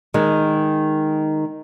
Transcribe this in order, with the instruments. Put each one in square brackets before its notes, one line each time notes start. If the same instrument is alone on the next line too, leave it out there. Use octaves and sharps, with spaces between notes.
[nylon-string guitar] D#3 G#3